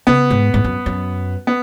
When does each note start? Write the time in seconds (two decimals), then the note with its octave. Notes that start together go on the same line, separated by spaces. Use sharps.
0.07 C#3 B3
0.30 G#2
0.54 G#2
0.64 F#2
0.86 F#2
1.47 B3